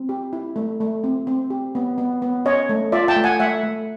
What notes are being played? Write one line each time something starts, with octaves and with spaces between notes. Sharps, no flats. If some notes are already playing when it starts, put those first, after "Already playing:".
Already playing: C4
G4
E4
A3
A3
C4
C4
G4
B3
B3
B3
C#4 C#5 D#5
A3
F4 D5 E5
G5 A5
A3
F#5 G#5
A3 E5 F#5
A3